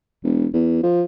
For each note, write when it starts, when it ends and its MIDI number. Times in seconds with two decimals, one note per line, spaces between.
0.24 0.47 28
0.53 0.78 40
0.83 1.04 53